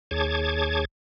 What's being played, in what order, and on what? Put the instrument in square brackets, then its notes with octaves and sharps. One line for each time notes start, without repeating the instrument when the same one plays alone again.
[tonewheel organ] D#2 G#4 C#5 A5 D6 G#6